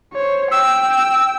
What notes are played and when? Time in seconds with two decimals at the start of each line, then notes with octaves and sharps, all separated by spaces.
0.13 C5 C#5
0.51 G5 E6